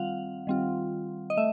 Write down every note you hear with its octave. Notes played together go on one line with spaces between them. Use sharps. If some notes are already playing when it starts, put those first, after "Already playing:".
Already playing: D#3 G3 C4 F4 F5 F#5
D#3 G3 C4 F4
D#5
A3 E5